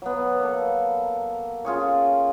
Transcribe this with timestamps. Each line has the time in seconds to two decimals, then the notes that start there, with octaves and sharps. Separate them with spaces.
0.02 F#3 B3
0.40 A#3 A4
1.65 C#4 F4 G#4 C#5